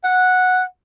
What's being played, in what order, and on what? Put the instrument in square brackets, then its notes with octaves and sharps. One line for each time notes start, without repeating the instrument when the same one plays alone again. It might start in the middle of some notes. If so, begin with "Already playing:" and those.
[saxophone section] F#5